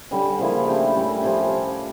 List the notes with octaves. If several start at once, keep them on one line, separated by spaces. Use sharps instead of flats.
D3 G3 C#4
C#3 F3 A#3 E4
A3 D4 G4
A2 G3 C#4
F3 C#4 G4 C#5